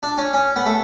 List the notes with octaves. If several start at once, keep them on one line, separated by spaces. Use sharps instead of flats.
D4
C#4
C#4
B3
A3